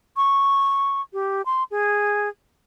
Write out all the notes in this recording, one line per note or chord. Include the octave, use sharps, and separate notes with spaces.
C#6
G4
C6
G#4